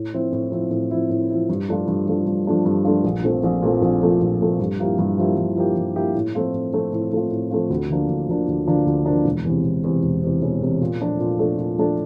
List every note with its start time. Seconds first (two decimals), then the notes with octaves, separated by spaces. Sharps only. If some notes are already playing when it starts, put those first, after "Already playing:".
Already playing: A2
0.13 F3 C4 E4
0.33 A2
0.52 F3 C4 E4
0.71 A2
0.90 F3 C4 E4
1.10 A2
1.30 F3 C4 E4
1.49 G2
1.68 F3 A3 D4 F4
1.88 G2
2.07 F3 A3 D4 F4
2.26 G2
2.47 F3 A3 D4 F4
2.65 G2
2.85 F3 A3 D4 F4
3.04 A#1
3.23 A#2 F3 A3 C4
3.43 A#1
3.62 A#2 F3 A3 C4
3.82 A#1
4.01 A#2 F3 A3 C4
4.21 A#1
4.41 A#2 F3 A3 C4
4.60 G2
4.79 F3 A#3 E4 G4
4.99 G2
5.18 F3 A#3 E4 G4
5.37 G2
5.56 F3 A#3 E4 G4
5.76 G2
5.96 F3 A#3 E4 G4
6.15 A2
6.35 F3 A3 C4 F4
6.53 A2
6.74 F3 A3 C4 F4
6.93 A2
7.12 F3 A3 C4 F4
7.31 A2
7.51 F3 A3 C4 F4
7.70 D2
7.90 D3 F3 A#3 D4
8.09 D2
8.29 D3 F3 A#3 D4
8.48 D2
8.67 D3 F3 A#3 D4
8.86 D2
9.06 D3 F3 A#3 D4
9.25 E1
9.45 E2 C3
9.64 E1
9.84 E2 C3
10.03 E1
10.23 E2 C3
10.42 E1
10.61 E2 C3
10.81 A#2
11.01 F3 A3 D4 A4
11.20 A#2
11.39 F3 A3 D4 A4
11.58 A#2
11.78 F3 A3 D4 A4